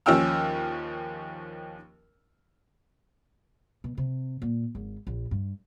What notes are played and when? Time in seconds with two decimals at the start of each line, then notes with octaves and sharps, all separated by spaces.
0.06 D#2 F3 C#4 G5 E6 F6
3.84 B2
3.98 C3
4.42 A#2
4.75 G#1
5.07 A#1
5.31 G2